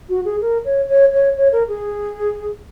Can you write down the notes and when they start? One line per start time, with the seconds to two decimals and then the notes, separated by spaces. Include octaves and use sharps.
0.09 F#4
0.25 G#4
0.41 A#4
0.65 C#5
0.89 C#5
1.13 C#5
1.37 C#5
1.52 A#4
1.68 G#4